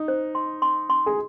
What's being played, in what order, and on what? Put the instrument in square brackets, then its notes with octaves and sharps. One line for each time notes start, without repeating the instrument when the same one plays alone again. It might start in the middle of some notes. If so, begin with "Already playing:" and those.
Already playing: [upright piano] D#4
[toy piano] C5
C6
C6
C6
[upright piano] G#4